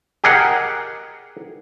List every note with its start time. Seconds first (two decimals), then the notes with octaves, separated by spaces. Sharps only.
0.24 G4 G#4 A#4 D#5 F#5